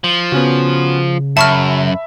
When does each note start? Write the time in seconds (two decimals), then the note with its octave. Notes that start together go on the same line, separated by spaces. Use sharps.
0.04 F3
0.32 C#3 B3 C#4 F#4
1.37 F#2 E5 A5 B5 C#6 F6